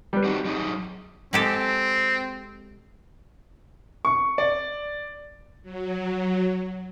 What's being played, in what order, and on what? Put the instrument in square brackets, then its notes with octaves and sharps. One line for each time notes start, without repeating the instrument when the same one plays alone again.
[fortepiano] G3 B4
[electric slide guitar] C4 D#4 F#4
F#3 D#4 G#4
[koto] G#3 G4 A4 [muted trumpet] C4
[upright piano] C#6
D5
[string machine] F#3